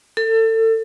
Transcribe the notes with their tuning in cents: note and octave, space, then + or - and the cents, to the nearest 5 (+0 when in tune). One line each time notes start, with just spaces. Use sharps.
A4 +30